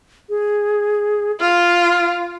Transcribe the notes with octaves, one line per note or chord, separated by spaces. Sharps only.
G#4
F4 F6